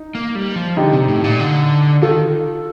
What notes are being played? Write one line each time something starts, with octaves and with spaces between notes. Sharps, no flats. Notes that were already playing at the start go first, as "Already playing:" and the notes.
Already playing: D#4
A#3
G3
F3
D3 D#4 G4
C3
A2
A#2
D3
D#3 F4 A4